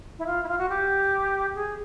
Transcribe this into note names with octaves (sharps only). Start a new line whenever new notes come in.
E4
F4
E4
F4
F#4
G4
G#4